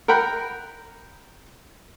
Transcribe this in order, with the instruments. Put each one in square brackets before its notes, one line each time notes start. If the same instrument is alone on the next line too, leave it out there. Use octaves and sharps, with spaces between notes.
[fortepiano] A#4 F#5 G5 B5